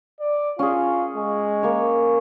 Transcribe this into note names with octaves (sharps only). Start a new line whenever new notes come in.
D5
C#4 F4 G#4
G#3
A#3 C#5